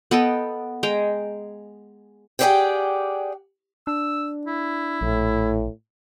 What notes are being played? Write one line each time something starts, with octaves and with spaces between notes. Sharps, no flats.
B3 A4 D#5 G5
G#3 G5 A#5
G4 G#4 C5 D5 F#5 G5
D4 E6
E4
A#1 A2